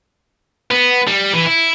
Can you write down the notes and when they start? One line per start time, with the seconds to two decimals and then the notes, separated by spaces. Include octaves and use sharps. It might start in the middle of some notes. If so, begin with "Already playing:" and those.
0.71 B3
1.07 G3
1.33 E3
1.46 E4